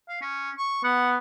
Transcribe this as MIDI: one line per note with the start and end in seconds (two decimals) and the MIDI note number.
0.08 0.16 77
0.21 0.50 61
0.58 0.82 85
0.84 1.18 59
0.84 1.11 78